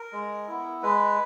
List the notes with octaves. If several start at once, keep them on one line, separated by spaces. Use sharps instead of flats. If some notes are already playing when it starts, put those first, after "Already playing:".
Already playing: A#4
G#3
B3 E4
G#3 B4